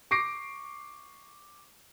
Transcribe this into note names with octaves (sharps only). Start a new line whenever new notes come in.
C#6 D6 A#6 C7 D7